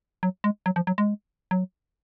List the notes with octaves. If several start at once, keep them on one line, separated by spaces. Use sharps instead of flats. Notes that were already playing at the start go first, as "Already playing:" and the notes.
F#3
G#3
F#3
F3
F#3
G#3
F#3